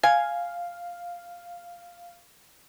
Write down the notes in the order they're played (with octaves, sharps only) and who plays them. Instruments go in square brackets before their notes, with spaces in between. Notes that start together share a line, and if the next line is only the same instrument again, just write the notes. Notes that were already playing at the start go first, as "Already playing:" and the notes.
[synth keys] F5 [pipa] G#5